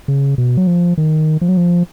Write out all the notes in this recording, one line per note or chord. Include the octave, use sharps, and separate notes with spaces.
C#3
B2
F#3
F3
D#3
F3
F#3
F3